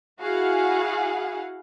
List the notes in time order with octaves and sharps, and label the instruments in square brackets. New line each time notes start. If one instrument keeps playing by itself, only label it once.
[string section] E4 F#4 G#4 F5 F#5